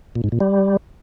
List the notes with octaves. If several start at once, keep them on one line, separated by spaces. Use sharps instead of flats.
A#2
G#2
A#2
G3